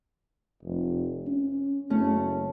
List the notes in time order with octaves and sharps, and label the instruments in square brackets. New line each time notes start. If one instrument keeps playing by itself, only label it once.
[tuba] F1
C#4
[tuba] F#1 [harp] A3 C#4